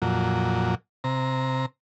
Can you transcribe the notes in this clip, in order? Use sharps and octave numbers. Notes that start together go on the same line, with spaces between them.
F2 A#2 F#3
C3 A#5